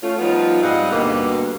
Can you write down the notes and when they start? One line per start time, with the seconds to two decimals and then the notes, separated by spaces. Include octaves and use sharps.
0.02 A3 C#4 F4
0.19 F3 G3 B3 D#4 F4
0.62 G#2 G3 C4 D#5 F5 F#5
0.91 D2 G2 B2 A#3 B3 A4